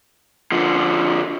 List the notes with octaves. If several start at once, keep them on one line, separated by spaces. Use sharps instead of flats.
D3 F3